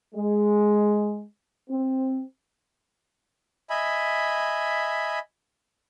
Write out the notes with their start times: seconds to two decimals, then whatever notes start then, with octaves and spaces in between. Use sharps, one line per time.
0.14 G#3
1.69 C4
3.70 D#5 E5 G#5 B5